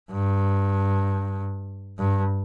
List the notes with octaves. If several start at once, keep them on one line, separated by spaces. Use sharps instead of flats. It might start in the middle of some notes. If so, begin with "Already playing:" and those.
G2
G2